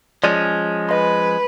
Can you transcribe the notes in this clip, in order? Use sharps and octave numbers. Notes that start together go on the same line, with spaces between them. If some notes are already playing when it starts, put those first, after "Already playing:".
F3 G#3 C#4 D5
B4 D#5 C6